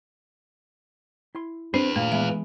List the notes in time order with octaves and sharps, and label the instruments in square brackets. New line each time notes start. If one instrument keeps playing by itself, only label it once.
[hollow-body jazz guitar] E4 C6
[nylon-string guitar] C4 [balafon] D4 [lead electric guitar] G#4 B4
[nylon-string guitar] A#2 [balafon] A3
[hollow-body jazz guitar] E3 G#3 B3 [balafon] E5